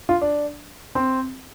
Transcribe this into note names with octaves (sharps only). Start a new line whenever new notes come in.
F4
D4
C4